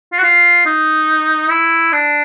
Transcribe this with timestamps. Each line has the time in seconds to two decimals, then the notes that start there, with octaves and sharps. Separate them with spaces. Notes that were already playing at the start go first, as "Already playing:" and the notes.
0.12 F4
0.18 F#4
0.23 F4
0.66 D#4
1.50 E4
1.93 D4